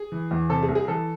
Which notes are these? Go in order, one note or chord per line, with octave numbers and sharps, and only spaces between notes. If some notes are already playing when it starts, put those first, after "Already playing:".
Already playing: G#4
E3
E2
C3 A4
G#4
C2
G#4
E3 A4